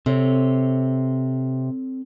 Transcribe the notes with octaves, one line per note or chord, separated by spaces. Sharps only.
C3 C4 A4 C#5